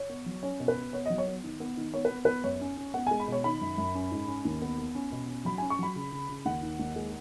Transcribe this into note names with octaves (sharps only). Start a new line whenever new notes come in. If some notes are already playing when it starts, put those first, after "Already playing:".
Already playing: C#5
B3
F#3
C#4 C#5
B2
B4
B2
B3 C#5
F#3 D#5
C#5
B3
D#3
B3
D#3
B3 C#5
B4
B3
B3 B4
F#2 C#5
C#4
C#4
B3 F#5
G#3 G#5
B5
B2 C#5
D#3 B5
F#2
F#2
C#4
G#2
C#4
D#2
B3
B3
C#4
B2
C#4
F#3 B5
C#4 G#5
C#6
F#3 B5
C#3
C#3
C#3
D#2 F#5
D#3
D#2
G#3